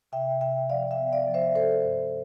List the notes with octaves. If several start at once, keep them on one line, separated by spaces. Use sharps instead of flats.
C3 E5 G5
C3 E5 G5
F3 D5 F5
E5 G5
B3
D5 F5
F3
C5 E5
G2 A4 C5
G2